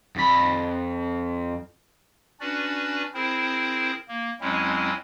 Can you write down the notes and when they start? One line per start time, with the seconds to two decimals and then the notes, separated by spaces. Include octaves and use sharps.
0.16 F2 B5
2.40 C#4 D4 F#4 B4 D5
3.14 C4 E4 G#4 A#4 C5
4.08 A#3
4.41 F2 F#3 G#3 C4 C#4 E4